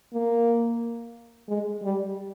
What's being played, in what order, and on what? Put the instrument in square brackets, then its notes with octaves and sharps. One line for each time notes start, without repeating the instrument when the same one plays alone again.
[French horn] A#3
G#3
G3